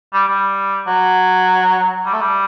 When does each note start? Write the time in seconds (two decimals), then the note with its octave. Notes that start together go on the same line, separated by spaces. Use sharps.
0.13 G3
0.28 G3
0.87 F#3
2.05 G3
2.13 A3
2.21 G3